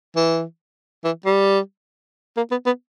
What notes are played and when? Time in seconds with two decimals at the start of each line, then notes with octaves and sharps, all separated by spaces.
0.16 E3
1.04 E3
1.26 G3
2.37 A#3
2.51 B3
2.66 B3